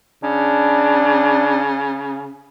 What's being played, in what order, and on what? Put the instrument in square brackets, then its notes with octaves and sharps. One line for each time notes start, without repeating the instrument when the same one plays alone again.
[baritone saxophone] C#3 [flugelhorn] D4